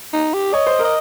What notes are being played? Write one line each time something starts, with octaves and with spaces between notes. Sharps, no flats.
D#4
G4
C#5 D#5
C5
A#4
D#5